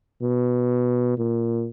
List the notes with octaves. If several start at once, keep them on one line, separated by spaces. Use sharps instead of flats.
B2
A#2